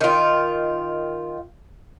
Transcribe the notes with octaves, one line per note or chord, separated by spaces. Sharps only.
D#3 F4